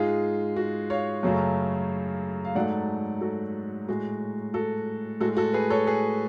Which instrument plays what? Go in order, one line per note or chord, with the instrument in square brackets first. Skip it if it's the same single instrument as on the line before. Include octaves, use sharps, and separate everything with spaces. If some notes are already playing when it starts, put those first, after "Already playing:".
Already playing: [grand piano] G#2 G#3 F4 G#4
F#4
C#5 F5
F#2 C#3 F#3 A3
F5
G#2 F#3 A3 D5 F#5
F#4 A4
A2 G#3 F#4
F#4 A4
A2 G#3 F#4 A4
F#4 A4
G#4 B4
A4 C#5
G#4 B4